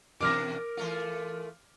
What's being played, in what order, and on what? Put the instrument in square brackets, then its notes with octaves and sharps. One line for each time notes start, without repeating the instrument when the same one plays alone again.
[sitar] B2 E3 D4 [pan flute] A#4 [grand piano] D6 F6 A#6
[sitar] E3 A3 F4